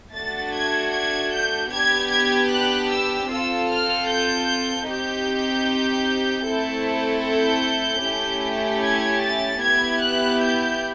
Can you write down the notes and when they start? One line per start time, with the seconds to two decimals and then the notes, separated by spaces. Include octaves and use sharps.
0.14 A3 D4 F#4 A6
0.54 G#6
0.93 G#6
1.33 G6
1.73 B3 D4 G4 G#6
2.12 G#6
2.52 F#6
2.91 E6
3.30 C4 F4 A4 E6
3.70 F6
4.09 G6
4.88 C4 D#4 G4 G6
6.46 A3 C4 E4 A4
7.25 G6
8.04 A3 C#4 E4 G4
8.84 G#6
9.23 A6
9.62 B3 E4 G4 G#6
10.01 F#6
10.42 G6